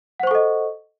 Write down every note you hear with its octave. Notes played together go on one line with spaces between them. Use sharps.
A4 C5 D#5 F#5 C#6